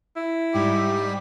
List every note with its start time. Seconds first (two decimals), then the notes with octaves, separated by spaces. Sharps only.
0.16 E4
0.53 G#2 G3 G4